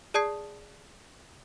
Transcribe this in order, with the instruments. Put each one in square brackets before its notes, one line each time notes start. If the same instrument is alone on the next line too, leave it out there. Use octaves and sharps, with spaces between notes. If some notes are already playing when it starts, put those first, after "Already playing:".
[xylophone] G#4 D5 A5 D#6 G#6 C7